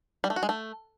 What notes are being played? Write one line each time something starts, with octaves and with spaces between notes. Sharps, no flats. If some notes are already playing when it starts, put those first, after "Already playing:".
G3
A3
F#4
G#3
A3